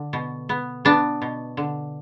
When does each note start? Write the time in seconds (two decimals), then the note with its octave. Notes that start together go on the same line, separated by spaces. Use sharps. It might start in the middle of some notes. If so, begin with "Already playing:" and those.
Already playing: D3
0.13 B2
0.49 B3
0.85 B3 D4
1.22 B2
1.57 D3